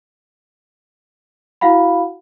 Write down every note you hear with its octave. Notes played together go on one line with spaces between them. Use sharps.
E4 F#4 F5 F#5 B5